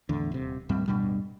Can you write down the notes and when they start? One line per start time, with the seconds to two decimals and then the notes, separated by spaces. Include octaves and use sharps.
0.09 E2 A2 D3
0.32 D#1 C3
0.69 D#2 A2 G3 C4
0.88 D1 G2 B2 G3